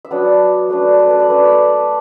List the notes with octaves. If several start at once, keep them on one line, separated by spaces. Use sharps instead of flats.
E5
F#3 B3 D4 F#5
A5
A3 D4 B4
B4
A4
D5
A3 D4 B4
B5